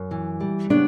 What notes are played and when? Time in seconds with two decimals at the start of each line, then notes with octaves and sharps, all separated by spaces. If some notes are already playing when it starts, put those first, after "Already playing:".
Already playing: F#2
0.11 E3
0.40 G3
0.70 C#3 B3 D4